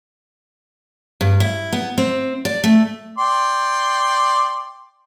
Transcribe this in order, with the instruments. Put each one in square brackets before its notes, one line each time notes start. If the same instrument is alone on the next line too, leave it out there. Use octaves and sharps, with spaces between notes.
[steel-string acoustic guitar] G2
E4
B3
C4
D5
A3
[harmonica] D5 G5 C6